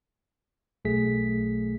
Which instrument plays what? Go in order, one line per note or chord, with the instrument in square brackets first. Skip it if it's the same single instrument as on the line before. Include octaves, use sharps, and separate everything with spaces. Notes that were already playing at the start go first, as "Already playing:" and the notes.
[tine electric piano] B1 A3 G#4 B6